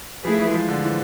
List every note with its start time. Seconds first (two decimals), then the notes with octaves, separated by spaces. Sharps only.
0.25 F3 A3 E4 G#4 B4
0.39 E3
0.48 G#3
0.54 F3
0.68 D3
0.84 E3